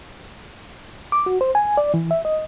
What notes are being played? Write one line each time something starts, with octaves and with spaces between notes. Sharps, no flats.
D6
F#4
C5
G#5
D5
E3
E5
D#5